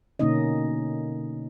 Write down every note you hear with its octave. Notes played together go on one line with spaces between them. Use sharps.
B2 D3 A#3 C#4 D#4 D#5